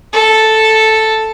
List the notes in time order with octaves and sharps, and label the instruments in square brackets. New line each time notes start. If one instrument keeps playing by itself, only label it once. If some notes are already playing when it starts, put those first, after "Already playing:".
[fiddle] A4